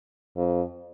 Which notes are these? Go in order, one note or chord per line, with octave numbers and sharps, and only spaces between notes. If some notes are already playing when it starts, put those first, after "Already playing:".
F2